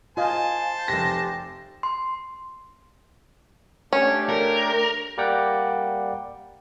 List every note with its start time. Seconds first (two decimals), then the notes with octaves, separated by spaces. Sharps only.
0.17 F4 C5 D#5 F5 G#5 A5
0.88 F1 G4 A#6
1.83 C6
3.93 A3 C#4 D4 G4
4.29 A#4
5.18 G3 A#3 A#4 D5 F#5 G5